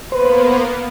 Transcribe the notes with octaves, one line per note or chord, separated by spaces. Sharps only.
A#3 B3 B4 C5